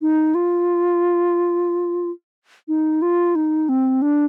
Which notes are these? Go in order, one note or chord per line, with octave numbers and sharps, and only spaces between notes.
D#4
F4
D#4
F4
D#4
C4
D4